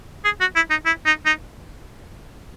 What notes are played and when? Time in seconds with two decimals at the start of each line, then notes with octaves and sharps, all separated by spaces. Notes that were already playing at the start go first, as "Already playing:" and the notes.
0.25 G#4
0.41 F#4
0.56 E4
0.70 D#4
0.86 E4
1.06 D#4
1.26 D#4